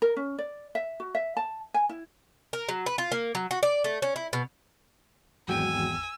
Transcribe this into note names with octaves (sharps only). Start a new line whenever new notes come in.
A#4
C#4
D5
E5
F#4
E5
A5
G#5
E4
A#4
F#3
B4
F4
A#3
F#3
F#4
D5
A3
C#4
E4
B2
G#1 E2 F#3 G#3 F#4 G5 G#5 E6